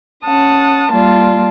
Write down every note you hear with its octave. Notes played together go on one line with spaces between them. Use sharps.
C#4 F#5 A5 D#6
G3 A#3 F4 D5 A5